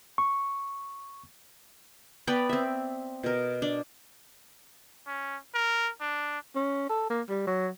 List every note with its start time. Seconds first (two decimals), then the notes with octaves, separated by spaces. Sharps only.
0.18 C#6
2.27 B3 B4 D5 G5
2.49 C4 E5
3.23 B2 A#4
3.62 D4
5.07 C#4
5.54 A#4
6.01 D4
6.56 C#4
6.90 A4
7.10 A#3
7.29 G3
7.47 F#3